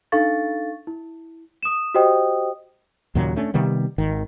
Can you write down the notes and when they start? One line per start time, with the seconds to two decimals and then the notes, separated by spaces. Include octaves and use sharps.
0.12 D4 D#4 A4 F5 C#6 A6
0.87 E4
1.63 D#6 E7
1.94 F#4 G4 C5 D#5 G5 D#6
3.15 D#2 A#2 C#3 F#3
3.36 A3 C#4 D4
3.54 C3 D#3 G3 B3
3.98 G#1 D#3